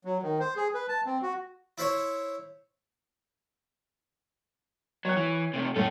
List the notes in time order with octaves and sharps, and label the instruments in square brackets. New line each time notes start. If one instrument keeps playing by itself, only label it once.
[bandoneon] F#3
D#3
C5
G#4
B4
A5
C4
F#4
[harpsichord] E4 C5 C#5
[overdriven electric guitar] F#3 [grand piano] C#5 F#6
[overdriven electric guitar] E3
C3 A3
[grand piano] A2 [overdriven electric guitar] C#4 A4